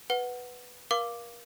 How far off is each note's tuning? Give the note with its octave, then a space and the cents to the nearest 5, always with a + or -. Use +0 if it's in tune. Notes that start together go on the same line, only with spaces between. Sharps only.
B4 +0 F#5 +0
A#4 +35 F5 +0 D6 +0